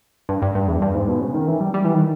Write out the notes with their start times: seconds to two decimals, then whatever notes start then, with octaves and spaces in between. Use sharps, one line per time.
0.29 G2
0.42 G2
0.55 G2
0.68 E2
0.82 G2
0.95 G#2
1.08 B2
1.21 C#3
1.34 D#3
1.48 E3
1.60 G3
1.74 G3
1.84 E3
1.94 D#3